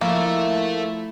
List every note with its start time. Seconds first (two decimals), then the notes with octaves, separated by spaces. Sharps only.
0.01 F3 A3 A#3 E4 A4 E5